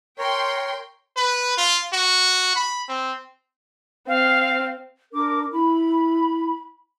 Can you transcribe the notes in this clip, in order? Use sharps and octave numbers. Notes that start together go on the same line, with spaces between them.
A#4 C#5 G5 C6
B4
F4
F#4
B5
C4
C4 F5
D4 A#4 D6
E4 B5